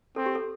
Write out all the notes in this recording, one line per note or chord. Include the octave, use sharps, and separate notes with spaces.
C4 A4
G4
A4